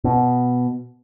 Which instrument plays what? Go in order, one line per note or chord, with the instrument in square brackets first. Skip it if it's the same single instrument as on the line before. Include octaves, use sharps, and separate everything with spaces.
[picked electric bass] B2